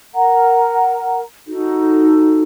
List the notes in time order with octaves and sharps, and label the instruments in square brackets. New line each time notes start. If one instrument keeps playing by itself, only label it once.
[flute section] A#4 F#5 A#5
D#4 F#4 A4